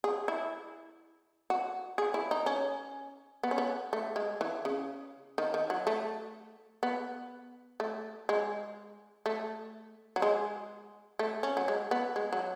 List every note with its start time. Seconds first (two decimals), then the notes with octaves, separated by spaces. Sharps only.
0.04 G#4
0.28 E4
1.50 F#4
1.98 G#4
2.14 E4
2.31 D#4
2.46 C#4
3.43 B3
3.51 C#4
3.58 B3
3.93 A3
4.16 G#3
4.41 E3
4.65 C#3
5.38 D#3
5.54 D#3
5.70 F#3
5.87 A3
6.83 B3
7.80 A3
8.29 G#3
9.26 A3
10.16 F#3
10.22 G#3
11.19 A3
11.43 C#4
11.57 F#3
11.68 G#3
11.91 B3
12.16 G#3
12.33 F#3